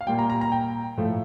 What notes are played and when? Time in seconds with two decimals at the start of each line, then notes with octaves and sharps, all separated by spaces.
0.01 F5
0.07 A#2 G3 A#3 G5
0.19 A#5
0.30 A#5
0.41 A#5
0.52 G5
0.97 A2 F3 A3